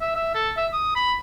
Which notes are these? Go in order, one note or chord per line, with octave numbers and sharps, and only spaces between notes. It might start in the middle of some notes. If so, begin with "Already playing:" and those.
E5
E5
A4
E5
D#6
B5